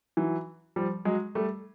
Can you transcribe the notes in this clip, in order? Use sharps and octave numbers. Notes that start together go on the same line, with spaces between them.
E3 F#3
F3 G3
F#3 G#3
G3 A3